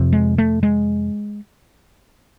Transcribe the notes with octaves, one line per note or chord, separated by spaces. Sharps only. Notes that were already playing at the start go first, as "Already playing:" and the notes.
Already playing: F2 C3
G#3
A3
G#3